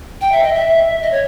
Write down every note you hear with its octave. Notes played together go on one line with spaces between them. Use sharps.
G5
E5
D#5
E5
D#5
C#5